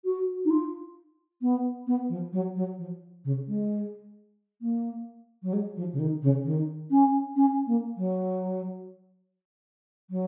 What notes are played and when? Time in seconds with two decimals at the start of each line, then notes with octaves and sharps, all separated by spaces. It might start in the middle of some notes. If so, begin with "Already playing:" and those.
0.04 F#4
0.45 D#4
0.50 F4
1.41 B3
1.87 B3
2.09 F3
2.32 F#3
2.55 F#3
2.78 F3
3.24 C#3
3.47 G#3
4.61 A#3
5.42 F#3
5.53 G#3
5.76 F3
5.93 C#3
5.98 D#3
6.22 C#3
6.44 D#3
6.90 C#4
7.36 C#4
7.66 A#3
7.97 F#3
10.10 F#3